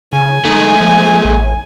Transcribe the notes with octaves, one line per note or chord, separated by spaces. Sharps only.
C#3 G#5
G#3 A3 D#4
F3
A1